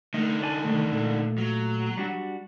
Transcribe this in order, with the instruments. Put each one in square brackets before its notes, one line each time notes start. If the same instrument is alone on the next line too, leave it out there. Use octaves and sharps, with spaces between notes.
[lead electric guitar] D3 D#4 [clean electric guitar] A3 D#5
[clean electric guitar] D5 G#5 A5
C2 D#3 A3
A#2 A3
[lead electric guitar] F#3
[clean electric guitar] G3 D4 F#4